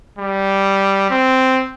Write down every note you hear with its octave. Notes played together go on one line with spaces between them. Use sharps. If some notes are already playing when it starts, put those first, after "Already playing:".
G3
C4